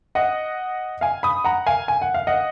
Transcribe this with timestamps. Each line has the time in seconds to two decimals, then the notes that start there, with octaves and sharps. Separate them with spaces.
0.15 D#5 F#5
1.01 F5 G#5
1.23 B5 D#6
1.44 F#5 A#5
1.66 F5 G#5
1.88 G#5
2.02 F#5
2.14 F5
2.27 D#5 F#5